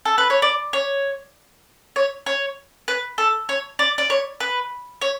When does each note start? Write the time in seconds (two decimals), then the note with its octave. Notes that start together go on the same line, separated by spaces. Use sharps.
0.05 A4
0.18 B4
0.30 C#5
0.42 D5
0.73 C#5
1.96 C#5
2.26 C#5
2.88 B4
3.18 A4
3.49 C#5
3.79 D5
3.98 D5
4.10 C#5
4.40 B4
5.01 C#5